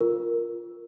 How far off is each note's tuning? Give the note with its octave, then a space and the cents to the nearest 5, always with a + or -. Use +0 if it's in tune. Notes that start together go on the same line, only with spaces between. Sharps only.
F4 +0 A#4 +0